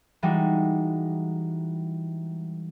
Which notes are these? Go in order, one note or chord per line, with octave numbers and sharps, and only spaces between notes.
E3 G3 G#3 D#4 F#4